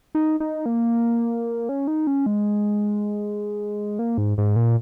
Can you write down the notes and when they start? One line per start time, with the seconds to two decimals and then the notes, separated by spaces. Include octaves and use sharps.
0.15 D#4
0.40 D#4
0.66 A#3
1.69 C#4
1.87 D#4
2.07 C#4
2.26 G#3
3.99 A#3
4.18 G#2
4.38 G#2
4.56 A#2